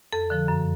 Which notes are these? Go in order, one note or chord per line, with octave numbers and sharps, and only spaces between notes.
F2 A4
D3 F3
F#2